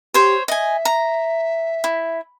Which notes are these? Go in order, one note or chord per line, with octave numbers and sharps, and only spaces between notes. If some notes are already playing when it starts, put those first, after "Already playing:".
G4 C5 C#5
D#5 E5 G#5
A#5
E4